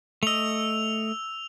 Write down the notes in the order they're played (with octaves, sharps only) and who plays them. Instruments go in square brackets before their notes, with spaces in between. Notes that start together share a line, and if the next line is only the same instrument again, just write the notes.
[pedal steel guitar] A3 D#5 [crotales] E6 F7